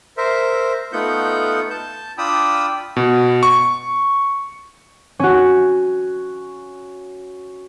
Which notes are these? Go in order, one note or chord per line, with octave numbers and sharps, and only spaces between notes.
A#4 C5 E5
A3 B3 D#4 F4 F#5 G6
A5 G6
D4 F4 G5 B5 D#6 E6
B2
C#6
C#4 F#4